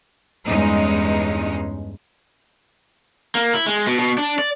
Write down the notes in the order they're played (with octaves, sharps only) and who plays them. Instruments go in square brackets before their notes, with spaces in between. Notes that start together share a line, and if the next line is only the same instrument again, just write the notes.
[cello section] E2 G2 G#3 C#4 D#4
[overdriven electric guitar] A#3
E4
G#3
B2
B2
D4
D5